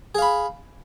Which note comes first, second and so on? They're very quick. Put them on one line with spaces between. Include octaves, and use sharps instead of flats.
G#4 F5 B5